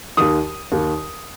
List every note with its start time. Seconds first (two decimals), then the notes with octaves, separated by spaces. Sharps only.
0.17 D#2 D#3 D#6
0.72 D#2 D#3